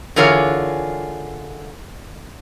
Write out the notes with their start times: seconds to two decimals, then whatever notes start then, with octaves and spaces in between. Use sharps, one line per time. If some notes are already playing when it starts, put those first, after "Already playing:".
0.16 D3 E3 F4 G#4 A#4 C#5